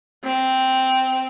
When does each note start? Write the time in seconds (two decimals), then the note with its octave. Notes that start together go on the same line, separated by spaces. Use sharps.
0.24 C4